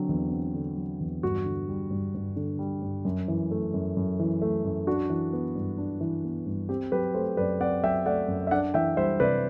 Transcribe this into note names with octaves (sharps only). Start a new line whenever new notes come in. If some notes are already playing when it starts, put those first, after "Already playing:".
Already playing: D3 F#3 C4
E2
C4
D3
F#3
E2
G2 F#4
D3
G3
G2
G2
D3
G3
G2
F#2
E3
A3
F#2
F#2
E3
A3
F#2
D4 F#4
E3
B3
G2
D4
E3
B3
G2
C4 G4
F#3 G4 B4
A3 A4 C5
F#2 B4 D5
C4 D5 F#5
F#3 E5 G5
A3 D5 F#5
F#2
E5
D4 D5 F#5
E3 E5 G5
G3 C5 E5
C3 B4 D5